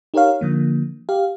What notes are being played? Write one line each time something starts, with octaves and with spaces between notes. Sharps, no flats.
D#4 G4 A#4 C#5 F5
D3 F3 A#3
G4 F5